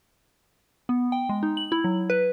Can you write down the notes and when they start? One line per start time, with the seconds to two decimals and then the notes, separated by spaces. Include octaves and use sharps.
0.89 B3
1.12 G5
1.29 G#3
1.43 D#4
1.57 F#7
1.72 E4
1.84 F#3
2.10 B4